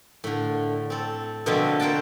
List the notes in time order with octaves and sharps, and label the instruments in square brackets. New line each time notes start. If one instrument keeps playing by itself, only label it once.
[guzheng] A2 D3
C4 A4
B2 D3 F3 F#3 C4 E5
A4 A#4 C5 F#5 G5 A5